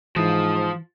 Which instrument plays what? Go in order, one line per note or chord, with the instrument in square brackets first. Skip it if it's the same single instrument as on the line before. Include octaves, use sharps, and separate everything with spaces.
[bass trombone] G#2 [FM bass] E3 [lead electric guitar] F3 [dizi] D#6